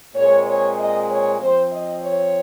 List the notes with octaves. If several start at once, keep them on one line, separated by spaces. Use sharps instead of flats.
A#2 G#3 C4 C#5
C#5
D#5
C#5
F3 C4 C5
D#5
C#5